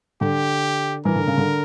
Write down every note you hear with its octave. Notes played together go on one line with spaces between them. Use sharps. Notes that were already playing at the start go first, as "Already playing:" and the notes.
D3 G4
E3 A#4
D3
C#3
D3